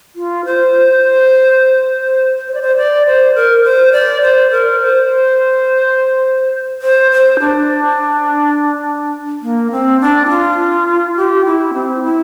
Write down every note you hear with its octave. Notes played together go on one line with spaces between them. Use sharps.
F4
C5
C5
D5
C5
D5
C5
A#4
C5
D5
C5
A#4
C5
C5
C5
D4
A#3
C4
D4
E4
F4
G4
E4
C4
E4